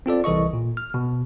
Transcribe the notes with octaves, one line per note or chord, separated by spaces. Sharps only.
C4 F4 A4 D5
C2 E3 A4 D#5 C#6
A#2
F6
B2